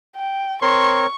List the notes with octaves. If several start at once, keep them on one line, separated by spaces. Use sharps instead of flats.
G5
C4 A#4 C#5 C6 C#6